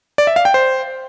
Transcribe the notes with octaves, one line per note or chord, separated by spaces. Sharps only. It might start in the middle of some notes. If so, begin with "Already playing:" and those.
D5
E5
F5
G5
C5